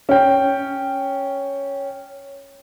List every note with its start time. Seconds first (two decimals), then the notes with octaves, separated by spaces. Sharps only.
0.09 C#4 G5